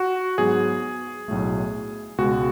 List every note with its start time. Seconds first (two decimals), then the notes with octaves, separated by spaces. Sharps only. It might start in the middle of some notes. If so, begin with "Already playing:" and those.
Already playing: F#4
0.38 G#2 F#3 B3 G#4
1.28 B1 A2 F#3 A3
2.18 C#2 B2 G#3 F#4